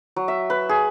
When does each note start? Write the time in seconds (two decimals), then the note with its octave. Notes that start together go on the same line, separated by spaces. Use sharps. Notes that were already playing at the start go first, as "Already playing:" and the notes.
0.16 F#3
0.28 E5
0.50 B4
0.69 G#4